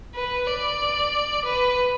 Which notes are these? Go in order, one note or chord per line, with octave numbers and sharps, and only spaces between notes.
B4
D5
B4